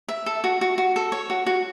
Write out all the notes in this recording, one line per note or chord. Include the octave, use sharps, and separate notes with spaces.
E5
A4
F#4
F#4
F#4
A4
C#5
F#4
F#4